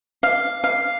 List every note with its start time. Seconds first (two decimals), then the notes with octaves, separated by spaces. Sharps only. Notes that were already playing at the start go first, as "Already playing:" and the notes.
0.23 F5
0.64 F5